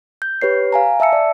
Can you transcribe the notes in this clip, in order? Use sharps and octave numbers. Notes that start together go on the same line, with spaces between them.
G6
G4 B4 C#5 C7
F5 G#5 A#5
E5 A5 E6 C#7
D5